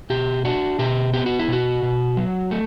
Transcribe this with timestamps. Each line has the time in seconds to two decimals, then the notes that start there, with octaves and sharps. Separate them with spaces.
0.10 B2 G4
0.45 D4 F#4
0.79 B2 G4
1.13 B3 G4
1.26 F#4
1.39 E4
1.48 B2 F#4
1.83 B2
2.17 F#3
2.51 A3